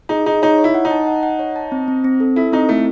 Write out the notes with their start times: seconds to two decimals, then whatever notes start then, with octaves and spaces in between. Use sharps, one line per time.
0.09 D#4 G#4
0.26 D#4 G#4
0.42 D#4 C#5
0.58 C#5
0.64 E4
0.74 F#5
0.85 D#4
0.91 A5
1.07 F#5
1.23 F#5
1.39 C#5
1.56 A5
1.72 C4
1.88 C4
2.04 C4
2.20 A4
2.36 E4 A4
2.53 C4 D#4
2.69 A3 E4